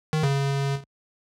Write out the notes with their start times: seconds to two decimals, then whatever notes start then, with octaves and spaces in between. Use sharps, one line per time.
0.13 D#3
0.23 C#3